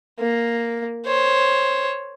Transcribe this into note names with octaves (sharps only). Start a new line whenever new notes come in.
A#3
C5 C#5